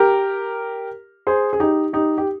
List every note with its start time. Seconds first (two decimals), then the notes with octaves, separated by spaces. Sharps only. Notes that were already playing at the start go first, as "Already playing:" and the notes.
Already playing: G4 A#4
1.27 G#4 C5
1.53 G#4
1.60 D#4 G4
1.93 D#4 G4
2.18 G4